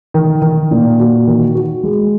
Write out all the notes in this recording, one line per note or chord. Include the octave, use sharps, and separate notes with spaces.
D#3
D#3
A#2
F#4
D#3
F#4
G#3